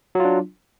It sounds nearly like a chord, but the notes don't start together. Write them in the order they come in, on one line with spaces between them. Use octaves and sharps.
F#3 F4 D4